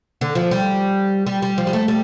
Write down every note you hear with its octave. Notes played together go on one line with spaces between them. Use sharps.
D3
F3
G3
G3
G3
F3
G3
A3
G3